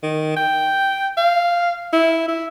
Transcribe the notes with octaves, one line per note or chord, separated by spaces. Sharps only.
D#3
G5
F5
E4
E4